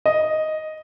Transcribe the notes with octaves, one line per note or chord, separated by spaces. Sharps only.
D#5